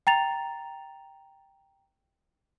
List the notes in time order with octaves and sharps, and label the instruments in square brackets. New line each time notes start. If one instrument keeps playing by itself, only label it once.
[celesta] G5 A#5 A6 F7